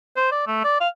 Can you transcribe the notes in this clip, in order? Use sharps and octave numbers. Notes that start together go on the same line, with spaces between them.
C5
D5
A3
D5
F5